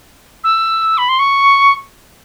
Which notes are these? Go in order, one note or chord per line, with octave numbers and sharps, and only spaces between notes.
E6
B5
C6
C#6